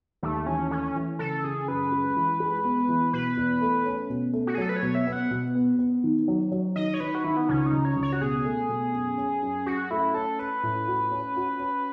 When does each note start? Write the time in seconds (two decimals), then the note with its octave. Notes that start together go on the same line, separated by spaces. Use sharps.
0.23 D#2 A3
0.46 E3 C#4
0.71 A3 C#4
0.96 E3
1.19 C#3 A4
1.44 C#3 G#4
1.68 F#2 B4
1.92 G#3
2.16 E3
2.40 G#3
2.65 B3
2.89 E3
3.13 B2 B4
3.37 E2
3.61 A3
3.86 C#4
4.10 B2
4.33 A3
4.47 F#4
4.55 G#4
4.58 F#3 A4
4.69 B4
4.76 C#5
4.82 B2
4.95 E5
5.07 B3
5.13 F#5
5.31 B2
5.55 B3
5.79 B3
6.04 D#3
6.28 F#3
6.52 F#3
6.76 D#3 D#5
6.94 C#5
7.00 D#3 B4
7.15 F#4
7.24 D#3 E4
7.37 B3
7.49 C#2 C#4
7.66 D#4
7.73 C#2
7.85 C#5
7.96 C#2
8.02 C#5
8.12 F#4
8.21 B2 G#4
8.45 A3
8.69 B2
8.93 F#2
9.18 C#4
9.42 F#2
9.66 F#2 F#4
9.91 A3 E4
10.14 C#4 A4
10.39 C#4 B4
10.63 A2
10.87 F#4
11.11 C#4
11.36 F#4
11.60 C#4